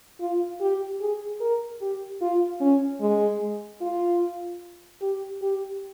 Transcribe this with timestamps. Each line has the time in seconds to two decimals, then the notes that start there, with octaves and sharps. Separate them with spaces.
0.20 F4
0.61 G4
1.01 G#4
1.41 A#4
1.81 G4
2.21 F4
2.61 C#4
3.01 G#3
3.81 F4
5.02 G4
5.42 G4